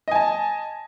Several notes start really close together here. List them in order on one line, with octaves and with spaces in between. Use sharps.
D#5 G#5 A5